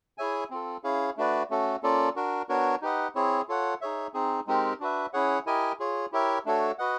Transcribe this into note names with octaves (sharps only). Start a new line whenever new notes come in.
E4 G#4 C#5 E5 G#5
C4 F4 A4
C#4 E4 G#4 C#5 F5
A3 D4 F#4 B4 D5
A3 C#4 F#4 A4
A#3 C#4 F4 A4 D5
D4 F#4 A#4
B3 D4 F#4 A#4 C#5
D#4 G4 B4 D#5 F#5
C4 E4 G#4 C#5
F4 A4 C#5 F#5
D#4 G#4 C#5 E5
C4 D#4 G#4
G#3 C4 D#4 G4 A#4
D4 F#4 B4 E5
C#4 E4 G#4 C#5 F#5
E4 G4 A#4 D#5 G#5
F4 G#4 C#5
E4 G4 A#4 C#5 E5
A3 D4 F#4 A4 C#5
F#4 B4 D#5 F#5